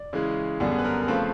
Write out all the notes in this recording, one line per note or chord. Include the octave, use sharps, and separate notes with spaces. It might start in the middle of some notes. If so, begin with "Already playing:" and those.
Already playing: D5
C#3 E3 G#3
F#2 D3 G3 B3 G#4
G#4
B4
A#4
A#4
C#3 F3 A3 C4 B4